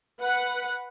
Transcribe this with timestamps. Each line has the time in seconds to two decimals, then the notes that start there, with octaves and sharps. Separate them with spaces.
0.19 B4 F#5